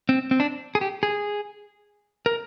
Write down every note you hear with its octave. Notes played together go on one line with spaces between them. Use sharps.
C4
C4
D4
G#4
G4
G#4
A#4